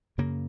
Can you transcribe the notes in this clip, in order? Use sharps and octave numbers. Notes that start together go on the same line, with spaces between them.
F#2 C#3 A#3